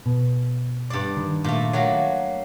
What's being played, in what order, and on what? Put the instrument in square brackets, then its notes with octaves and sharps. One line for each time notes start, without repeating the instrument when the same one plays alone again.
[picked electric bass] B2
[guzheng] G2 D5
[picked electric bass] D#3
[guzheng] A#2 A3
F#3 A3 A#3